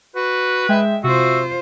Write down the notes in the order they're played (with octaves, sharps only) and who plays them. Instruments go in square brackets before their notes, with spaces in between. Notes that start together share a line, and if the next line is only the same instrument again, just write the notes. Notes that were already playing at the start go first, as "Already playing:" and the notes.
[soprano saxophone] F#4 [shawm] B4
[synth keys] G#3 G5 [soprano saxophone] E5
[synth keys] C3 [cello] F4 C5 [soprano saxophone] F#4 [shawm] E5